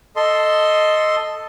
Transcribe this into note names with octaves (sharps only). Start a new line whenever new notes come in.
A4 D#5 C6